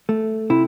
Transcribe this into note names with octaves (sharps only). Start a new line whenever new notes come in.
A3
C3 E4